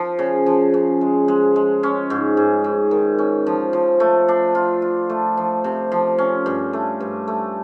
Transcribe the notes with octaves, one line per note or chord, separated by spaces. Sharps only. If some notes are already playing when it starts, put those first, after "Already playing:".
Already playing: F3
C#3
F3
C#3
G#3
G#3
G#3
C#4
G#2
G#2
G#2
D#3
C#4
F3
F3
A3
D4
F4
F4
A3
F3
C3
F3
C#4
G2
A3
G2
A3